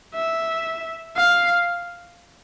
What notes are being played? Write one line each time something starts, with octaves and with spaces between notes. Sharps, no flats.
E5
F5